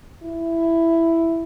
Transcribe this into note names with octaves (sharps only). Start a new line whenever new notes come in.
E4